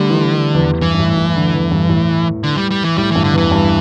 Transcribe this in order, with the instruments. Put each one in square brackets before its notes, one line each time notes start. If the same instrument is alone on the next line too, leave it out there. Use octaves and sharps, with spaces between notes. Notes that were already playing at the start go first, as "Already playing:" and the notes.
Already playing: [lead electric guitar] D3 [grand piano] G3 A3
[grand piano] E3
E2
[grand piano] G2 [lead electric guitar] E3
[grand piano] G2
A2
A2
D3
E2
G2
A2
[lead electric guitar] D3
G3
G3
E3
[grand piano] A2 [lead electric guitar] G3
[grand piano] G2 [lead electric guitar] E3
[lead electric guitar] D3
[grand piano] E2 [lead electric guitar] E3
[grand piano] G2